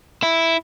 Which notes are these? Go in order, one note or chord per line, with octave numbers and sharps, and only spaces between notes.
E4